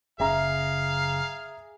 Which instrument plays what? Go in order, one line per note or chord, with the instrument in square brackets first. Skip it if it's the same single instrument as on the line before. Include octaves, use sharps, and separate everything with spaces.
[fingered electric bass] F#1 C#3 [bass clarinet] G#4 [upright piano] E5 A#5 [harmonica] F5